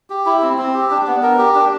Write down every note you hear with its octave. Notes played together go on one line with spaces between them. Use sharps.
G4
E4
C4
C4
G4
D4
B3
A#4
G4
D4